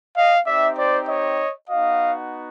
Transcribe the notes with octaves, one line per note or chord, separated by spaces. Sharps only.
D#5 F5
C4 D#4 G4 D5 E5
C5 D5
C#5 D#5
B3 D#4 F#4 D#5 F5